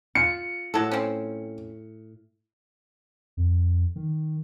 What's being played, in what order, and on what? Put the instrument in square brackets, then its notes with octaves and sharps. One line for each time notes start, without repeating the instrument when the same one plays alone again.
[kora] F4 [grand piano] C#7
[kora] A2 [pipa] F#3 A4
[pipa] C4 C#4
[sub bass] F2
D#3